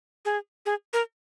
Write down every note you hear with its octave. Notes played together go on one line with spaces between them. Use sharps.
G#4
G#4
A#4